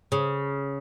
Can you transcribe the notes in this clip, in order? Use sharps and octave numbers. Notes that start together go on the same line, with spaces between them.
C#3